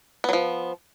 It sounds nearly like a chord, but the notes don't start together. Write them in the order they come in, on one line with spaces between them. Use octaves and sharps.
B3 F#3 F3